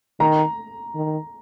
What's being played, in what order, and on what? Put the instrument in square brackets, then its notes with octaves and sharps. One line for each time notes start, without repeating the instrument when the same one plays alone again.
[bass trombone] D#3 [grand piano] A#5
[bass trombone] D#3